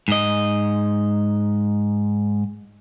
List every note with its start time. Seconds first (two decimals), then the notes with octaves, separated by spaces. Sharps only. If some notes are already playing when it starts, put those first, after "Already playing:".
0.08 G#2 D#5